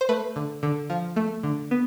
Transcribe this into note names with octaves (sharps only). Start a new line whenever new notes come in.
C5
A3 B4
D3
D3
F3
A3
D3
B3